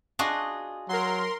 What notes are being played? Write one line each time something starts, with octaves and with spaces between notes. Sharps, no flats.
D4 F4 F#4 G#4 D#5
F#3 A#4 C6